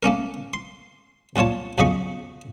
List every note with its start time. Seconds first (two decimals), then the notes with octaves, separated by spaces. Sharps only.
0.03 A3 A#3 C#4 A#4
0.54 C6
1.36 C2 A#2 F4 C#5 A5
1.78 B1 F2 C#3 D#5 B5 C#6